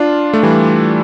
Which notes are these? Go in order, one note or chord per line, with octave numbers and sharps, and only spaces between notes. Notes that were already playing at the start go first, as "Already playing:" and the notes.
Already playing: D4 F4
A3
E3 G3